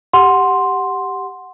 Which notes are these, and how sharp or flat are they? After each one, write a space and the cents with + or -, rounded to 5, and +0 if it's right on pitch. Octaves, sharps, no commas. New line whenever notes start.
G4 +0 F#5 +0 C6 +0